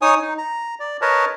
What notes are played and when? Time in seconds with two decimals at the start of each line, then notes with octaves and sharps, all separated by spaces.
0.02 D#4 C#5 G#5 D#6
0.22 D#4
0.38 A#5
0.80 D5
1.01 A#4 B4 C#5 D#5 A5